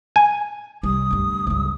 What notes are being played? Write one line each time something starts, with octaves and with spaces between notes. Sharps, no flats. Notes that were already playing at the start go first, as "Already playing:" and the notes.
G#5
C2 G3 D#6
D2 G2
C#2 G2